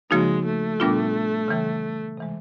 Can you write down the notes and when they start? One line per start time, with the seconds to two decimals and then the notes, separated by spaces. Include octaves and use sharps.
0.11 C#3 F3 G#3 A#3 D#4 F#4
0.45 A3
0.80 A#2 G3 B3 D4 F4
1.48 C#3 E3 G3
2.17 C3 E3 G#3